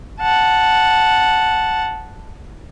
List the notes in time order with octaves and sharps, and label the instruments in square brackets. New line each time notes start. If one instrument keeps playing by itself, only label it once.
[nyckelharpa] F#5 A5